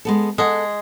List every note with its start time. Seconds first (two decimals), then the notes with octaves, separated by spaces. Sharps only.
0.05 G#3 B3 A4
0.38 G#3 A4 F#5